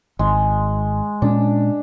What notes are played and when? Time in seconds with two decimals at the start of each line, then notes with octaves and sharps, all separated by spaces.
0.19 G#1 G#3
1.22 A#2 G#3 C#4 D4